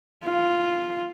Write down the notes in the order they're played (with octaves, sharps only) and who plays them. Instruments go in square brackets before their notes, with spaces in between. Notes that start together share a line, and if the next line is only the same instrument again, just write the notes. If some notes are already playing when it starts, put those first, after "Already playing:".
[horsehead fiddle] F4